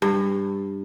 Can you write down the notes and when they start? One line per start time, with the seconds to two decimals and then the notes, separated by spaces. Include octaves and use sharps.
0.02 G2